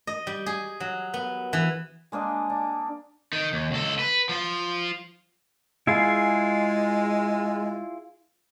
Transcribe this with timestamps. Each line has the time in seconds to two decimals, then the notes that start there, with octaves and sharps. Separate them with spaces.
0.07 D#5
0.27 G3
0.46 G#4
0.80 F#3
1.14 B3
1.53 E3
2.12 G#3 A#3 D4 D#5
2.50 D4
3.33 D#3
3.53 D#2
3.71 C#2 A4
3.99 B4
4.29 F3 F4
5.87 G#3 E4 F4 G#4